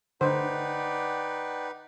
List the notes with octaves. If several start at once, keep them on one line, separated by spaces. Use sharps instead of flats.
D3 D#4 B4 C5 D5 F#5 G5